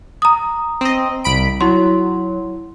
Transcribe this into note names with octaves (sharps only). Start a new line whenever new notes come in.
A#5 D#6
C4 D#5
C2 B5 D7
F#3 E4 C6